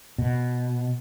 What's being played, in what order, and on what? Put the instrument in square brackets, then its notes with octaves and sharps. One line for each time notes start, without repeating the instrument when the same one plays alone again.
[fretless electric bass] B2